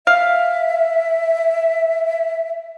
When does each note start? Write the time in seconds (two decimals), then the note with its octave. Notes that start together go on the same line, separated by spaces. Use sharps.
0.07 E5 F5